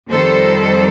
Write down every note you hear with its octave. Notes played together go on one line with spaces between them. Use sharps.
F2 D#3 G3 A4 C5